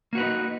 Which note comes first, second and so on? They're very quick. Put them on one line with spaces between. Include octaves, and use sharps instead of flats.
A#3 F#4 B4 D#4